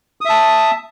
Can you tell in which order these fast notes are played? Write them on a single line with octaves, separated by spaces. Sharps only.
D#6 E5 A5